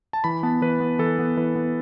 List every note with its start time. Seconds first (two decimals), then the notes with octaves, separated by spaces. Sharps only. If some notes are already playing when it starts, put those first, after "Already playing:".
0.13 A5
0.24 E3 B5
0.43 B3 A5
0.62 E3 B4
0.80 B3
0.99 E3 A4
1.19 B3
1.37 E3 B4
1.55 B3